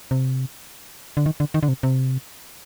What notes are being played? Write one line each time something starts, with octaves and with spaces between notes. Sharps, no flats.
C3
D3
D#3
D3
D#3
D3
C3
C3